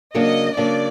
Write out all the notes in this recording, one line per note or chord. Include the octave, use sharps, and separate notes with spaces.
C#3 F#3 A#3 D4 D#5
C#3 F#3 A#3 D4 D5